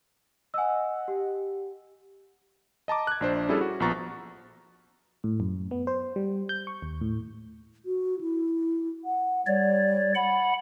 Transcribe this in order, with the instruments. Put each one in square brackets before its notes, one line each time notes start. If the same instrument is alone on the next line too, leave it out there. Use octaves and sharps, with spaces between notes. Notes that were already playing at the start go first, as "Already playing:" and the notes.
[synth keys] D#5 F#5 [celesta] G#5 E6
[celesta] G4
[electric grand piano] D#5 A5 A#5 D6
F#6 G#6
A#1 D4 C5
G3 C#4 E4 G#4 A4
F#4
A#1 F3 B3 A#5 C#6 A6
[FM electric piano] A2
F#2
B3
C5
G3
G6
C#6
D#2
A2
[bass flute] F#4
E4
F#5
[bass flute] G3 [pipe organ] C#5 D5
[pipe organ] F#5 B5